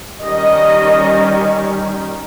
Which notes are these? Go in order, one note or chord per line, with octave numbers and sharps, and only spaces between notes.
D#3 G3 C#4 D#5